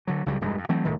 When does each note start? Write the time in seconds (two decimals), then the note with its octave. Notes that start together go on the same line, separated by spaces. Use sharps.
0.07 D3 F#3
0.26 C#2 C#3 F#3 G3
0.41 E1 G2 G#3
0.57 F2
0.69 E3 F#3 A3 C4
0.85 D#1 C2 A2 D#3